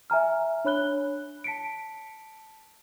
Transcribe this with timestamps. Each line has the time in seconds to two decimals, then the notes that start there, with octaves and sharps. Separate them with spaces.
0.10 E5 G#5 A#5 F6
0.65 D4 C#5 B5 F#6 G7
1.44 A5 B6 C#7 D7